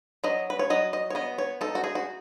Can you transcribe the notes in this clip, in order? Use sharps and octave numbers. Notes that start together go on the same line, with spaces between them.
F#3 D#5
B4
C#5
F#3 D#5
D#5
C#5
B3 D#5
C#5
D#4 A4
F#4
G#4
F#4